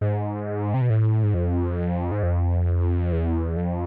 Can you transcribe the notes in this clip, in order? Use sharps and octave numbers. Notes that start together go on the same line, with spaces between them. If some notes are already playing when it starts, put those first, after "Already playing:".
G#2
C3
B2
A2
G#2
F2
G#2
F2
E2
F2